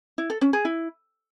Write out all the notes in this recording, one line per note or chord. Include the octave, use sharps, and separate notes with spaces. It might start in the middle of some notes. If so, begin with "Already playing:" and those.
E4
A4
C#4
G#4
E4